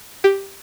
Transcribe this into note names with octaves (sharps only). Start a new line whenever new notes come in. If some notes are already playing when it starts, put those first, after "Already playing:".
G4